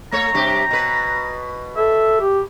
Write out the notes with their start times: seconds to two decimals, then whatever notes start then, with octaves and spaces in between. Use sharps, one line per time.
0.12 A3 C#5 A#5
0.34 G2 C3 G4
0.71 B2 B4
1.77 A4 E5
2.21 G4